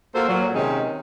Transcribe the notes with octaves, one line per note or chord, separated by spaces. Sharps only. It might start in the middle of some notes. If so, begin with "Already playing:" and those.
A#3 F4 F#4 A4 C5
A#2 F#3
C3 D#3 G#3 C#4 D#4